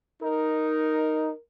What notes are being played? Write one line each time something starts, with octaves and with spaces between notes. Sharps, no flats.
D#4 A#4